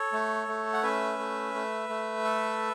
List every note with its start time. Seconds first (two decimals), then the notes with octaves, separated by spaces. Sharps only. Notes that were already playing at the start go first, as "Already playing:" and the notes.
Already playing: A4 C#5
0.13 A3
0.48 A3
0.73 F#5
0.83 C#4 B4 E5
1.19 A3
1.54 A3
1.89 A3
2.24 A4